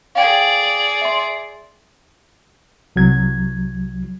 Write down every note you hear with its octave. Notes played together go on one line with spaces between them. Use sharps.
G#4 D5 F5 G5 G#6
E5 C6
C2 F#3 G#6